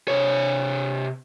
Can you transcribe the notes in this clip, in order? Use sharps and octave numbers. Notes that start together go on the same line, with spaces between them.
C3 C#5